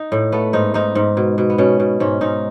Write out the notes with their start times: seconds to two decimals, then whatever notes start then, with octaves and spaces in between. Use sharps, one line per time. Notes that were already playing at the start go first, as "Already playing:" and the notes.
Already playing: D#4
0.12 A2
0.32 A3 B3
0.53 G#2 D#4
0.74 G#2 D#4
0.95 G#2
1.17 B2
1.38 B2
1.50 B3
1.58 B2 C#4
1.80 B2
2.00 G#2 C#4
2.21 G#2 D#4